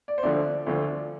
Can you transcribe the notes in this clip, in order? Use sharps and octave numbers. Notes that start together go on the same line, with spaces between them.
D5
C5
D2 D3 F3 D5
D2 D3 F3